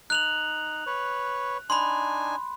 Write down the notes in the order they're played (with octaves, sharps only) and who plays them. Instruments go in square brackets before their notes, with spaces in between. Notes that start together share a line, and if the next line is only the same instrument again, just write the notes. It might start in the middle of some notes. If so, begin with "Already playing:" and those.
[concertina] D#4 [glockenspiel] F#6 F7 F#7
[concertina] B4 C#5
[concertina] D4 D#4 G#5 [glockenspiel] B5 C6